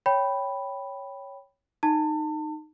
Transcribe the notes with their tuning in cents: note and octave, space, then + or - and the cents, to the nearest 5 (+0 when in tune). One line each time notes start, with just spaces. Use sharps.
C#5 +0 G5 +0 B5 +0
D#4 -10 A5 +35